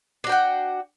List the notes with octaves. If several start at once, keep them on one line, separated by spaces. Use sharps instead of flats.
D4 F#4 F#5 G5